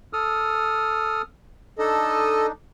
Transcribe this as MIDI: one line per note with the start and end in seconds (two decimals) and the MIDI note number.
0.13 1.22 69
0.13 1.22 87
0.13 1.22 89
1.79 2.52 62
1.79 2.52 63
1.79 2.46 69
1.79 2.46 75